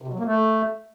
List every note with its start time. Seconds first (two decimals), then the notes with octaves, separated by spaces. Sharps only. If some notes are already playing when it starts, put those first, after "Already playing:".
0.02 C3
0.08 B2
0.13 F#3
0.19 A#3
0.25 A3